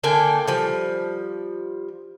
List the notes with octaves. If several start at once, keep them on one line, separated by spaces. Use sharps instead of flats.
D3 A#3 G5 G#5
F3 G3